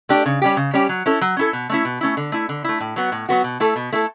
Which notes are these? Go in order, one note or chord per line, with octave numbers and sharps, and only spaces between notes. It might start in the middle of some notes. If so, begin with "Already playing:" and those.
A3 D4 G4
C#3
G3 C#4 G4
C#3
G3 C#4 G4
F#3
C#4 E4 A4
F#3
C#4 E4 A4
B2
A3 C#4 E4
B2
A3 C#4 E4
D3
A3 E4
D3
A3 E4
A2
F#3 B3 F#4
A2
F#3 B3 F#4
B2
A3 E4 A4
B2
A3 E4 A4